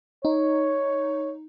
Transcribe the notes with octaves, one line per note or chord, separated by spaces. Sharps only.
D#4 C#5